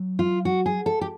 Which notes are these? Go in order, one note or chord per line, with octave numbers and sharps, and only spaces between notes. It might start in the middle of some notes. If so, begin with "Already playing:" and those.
Already playing: F#3
F4
F#4
G#4
A4
G4